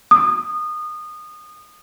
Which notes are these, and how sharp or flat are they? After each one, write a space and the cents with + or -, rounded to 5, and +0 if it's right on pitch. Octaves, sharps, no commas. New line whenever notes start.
D#6 -25